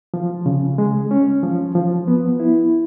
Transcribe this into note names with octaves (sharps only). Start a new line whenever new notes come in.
F3
C#3
G#3
C#4
F3
F3
B3
E4